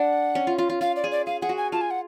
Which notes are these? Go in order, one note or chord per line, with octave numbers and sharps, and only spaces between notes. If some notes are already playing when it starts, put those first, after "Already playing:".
Already playing: D4 F#5
C#4
F4
F4
F4
F4 F5
D5
G#4
D5
G#4 F5
G#4 F#5
F#4
G#5
F4 A5
G#5
F#5